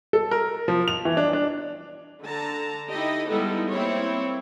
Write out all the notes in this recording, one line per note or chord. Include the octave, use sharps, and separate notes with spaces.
A4
A#4
F3
F7
E3
D4
D4
D3 A5 A#5
D#4 E4 G4 A4 D#5
G3 G#3 B3 D#4 E4 A4
A#3 C4 E4 C#5